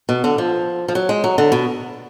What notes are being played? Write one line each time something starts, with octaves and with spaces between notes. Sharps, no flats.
B2
D3
F3
F3
F#3
G#3
F#3
D3
B2